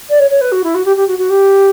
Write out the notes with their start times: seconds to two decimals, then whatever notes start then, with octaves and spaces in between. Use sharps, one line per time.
0.09 D5
0.19 C#5
0.30 C#5
0.41 B4
0.52 F#4
0.63 E4
0.74 F#4
0.85 G4
0.96 G4
1.07 F#4
1.18 F#4
1.29 G4